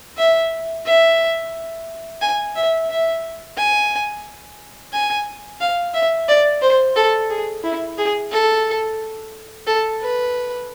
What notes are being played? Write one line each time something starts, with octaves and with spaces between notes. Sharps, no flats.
E5
E5
G#5
E5
E5
G#5
G#5
F5
E5
D5
C5
A4
G#4
E4
G#4
A4
A4
B4